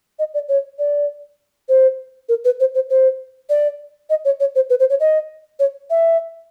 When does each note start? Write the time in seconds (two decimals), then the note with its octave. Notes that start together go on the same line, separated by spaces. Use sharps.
0.19 D#5
0.34 D5
0.49 C#5
0.79 D5
1.69 C5
2.29 A#4
2.45 B4
2.60 C5
2.75 C5
2.90 C5
3.49 D5
4.10 D#5
4.25 C#5
4.40 C#5
4.55 C5
4.70 B4
4.80 C5
4.90 C#5
5.00 D#5
5.59 C#5
5.90 E5